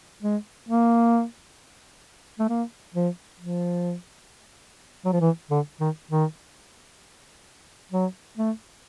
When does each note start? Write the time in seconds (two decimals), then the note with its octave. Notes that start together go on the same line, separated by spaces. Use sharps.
0.23 G#3
0.69 A#3
2.40 A3
2.49 A#3
2.95 F3
3.40 F3
5.05 F#3
5.13 F3
5.21 E3
5.51 D3
5.81 D#3
6.11 D#3
7.92 F#3
8.37 A3